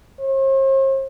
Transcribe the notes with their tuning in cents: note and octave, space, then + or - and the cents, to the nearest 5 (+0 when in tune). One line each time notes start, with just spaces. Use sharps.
C5 +45